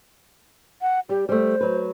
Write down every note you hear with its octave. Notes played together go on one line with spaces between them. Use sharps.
F#5
G3 G4
G3 A3 C5
F#3 B4